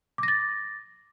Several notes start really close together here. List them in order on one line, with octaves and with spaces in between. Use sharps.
D6 A#6 A6